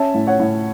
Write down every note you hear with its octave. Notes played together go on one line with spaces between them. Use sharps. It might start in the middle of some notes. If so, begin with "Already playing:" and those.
Already playing: C#4 E5 A5
A2
C#5 F#5
A2